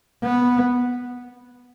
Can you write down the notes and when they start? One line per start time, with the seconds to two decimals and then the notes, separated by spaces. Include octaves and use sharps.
0.23 B3